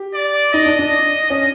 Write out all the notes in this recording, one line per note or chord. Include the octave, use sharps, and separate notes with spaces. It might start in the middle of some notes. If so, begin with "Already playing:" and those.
Already playing: G4
D5
D#4 D#5
D4
D4
C#4